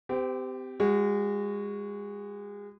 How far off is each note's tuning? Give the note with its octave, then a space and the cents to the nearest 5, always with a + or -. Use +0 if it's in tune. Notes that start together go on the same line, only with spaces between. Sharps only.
C4 -35 G4 +0
G#3 -30 F#4 +0